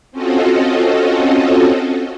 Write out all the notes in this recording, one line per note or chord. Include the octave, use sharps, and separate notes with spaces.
C4 C#4 F4 F#4 A4 D#5